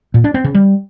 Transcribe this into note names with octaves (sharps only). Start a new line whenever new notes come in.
A#2
D4
C4
C#3
G3